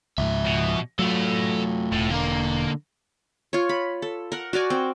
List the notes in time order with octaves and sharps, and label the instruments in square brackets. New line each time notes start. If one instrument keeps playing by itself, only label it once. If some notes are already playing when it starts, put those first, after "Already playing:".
[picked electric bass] C#2 G#2 [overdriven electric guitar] F3 E5
[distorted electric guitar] B2
[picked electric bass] F#3 [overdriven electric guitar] A3 F4 [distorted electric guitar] A4 B5
[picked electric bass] E1 [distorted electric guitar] A2
[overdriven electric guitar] D3 A#4 [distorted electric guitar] A#3
[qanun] F4 C#5
B5
A4
A#4 F#5
F#4 A#4 D5 G#5
C4